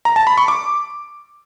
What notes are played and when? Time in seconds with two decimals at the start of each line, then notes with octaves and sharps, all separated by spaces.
0.05 A#5
0.16 A5
0.27 B5
0.37 C#6
0.48 D6